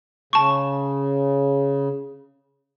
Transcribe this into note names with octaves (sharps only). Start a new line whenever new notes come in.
C#3 A5 C#6